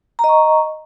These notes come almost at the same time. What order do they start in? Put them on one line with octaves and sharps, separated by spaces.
A#5 D#5 C#6